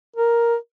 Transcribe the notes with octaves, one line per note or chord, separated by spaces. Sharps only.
A#4